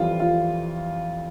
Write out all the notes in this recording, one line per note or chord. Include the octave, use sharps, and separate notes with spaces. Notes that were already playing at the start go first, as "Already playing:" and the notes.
Already playing: F2 E3 G3 F4
F4